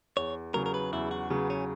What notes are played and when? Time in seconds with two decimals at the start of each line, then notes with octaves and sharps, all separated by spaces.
0.17 E2 C#5
0.54 C#3 F#3 A#4
0.66 A#4
0.74 B4
0.92 E2 E4
1.11 F#4
1.30 C#3 F#3 B3
1.50 C#4